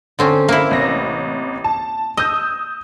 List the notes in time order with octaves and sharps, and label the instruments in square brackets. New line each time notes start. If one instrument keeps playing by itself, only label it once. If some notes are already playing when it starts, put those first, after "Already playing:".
[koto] D3 C4 C#4
A#3 E4
[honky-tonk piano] A1 C3 A#6
A5
[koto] D#5 [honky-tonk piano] D#6 E6 G6